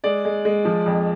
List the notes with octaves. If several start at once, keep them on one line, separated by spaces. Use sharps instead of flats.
G#3 D5
G#3
G#3
F3
F2